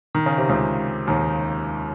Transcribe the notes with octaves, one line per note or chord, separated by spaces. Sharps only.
D#3
C#3
C3
C#2 C#3
D#2 D#3